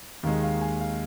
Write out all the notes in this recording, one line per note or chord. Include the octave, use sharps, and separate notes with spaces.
D#2 D#3 G#3 F5
F5
G#5
F5